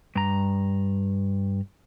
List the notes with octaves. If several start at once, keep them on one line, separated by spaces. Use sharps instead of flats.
G2 A#5